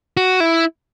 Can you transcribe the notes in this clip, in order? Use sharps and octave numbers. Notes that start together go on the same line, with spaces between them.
F#4
E4